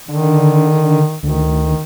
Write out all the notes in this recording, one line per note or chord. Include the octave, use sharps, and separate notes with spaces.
D3 D#3
D2 D#3